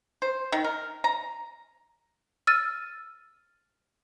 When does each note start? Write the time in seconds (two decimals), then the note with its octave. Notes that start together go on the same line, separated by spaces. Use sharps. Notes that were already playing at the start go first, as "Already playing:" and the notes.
0.22 C5
0.52 D#3
0.64 A#4
1.04 A#5
2.47 E6 F6 A6 D#7